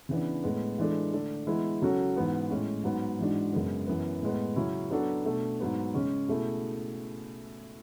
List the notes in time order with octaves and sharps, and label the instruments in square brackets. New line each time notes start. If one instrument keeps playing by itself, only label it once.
[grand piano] C#3 E3 B3 D4
A2 G#3 B3
E3 G#3 D4 A4
D3 A3 D4 A4
E3 G#3 B3 E4
C#3 F#3 C#4 F#4 A4
G#2 E3 B3 E4
A2 G#3 C#4
G#2 F#3 B3
G#2 E3 G#3 D4 F#4
F#2 C#3 G#3 B3
F#2 E3 B3
A2 G#3 B3
C#3 F#3 C#4 E4
F#3 B3 D4 F#4 A4
B2 A3 D4 A4
G#2 F#3 B3
C#3 G#3 C#4
B2 A3 E4 G#4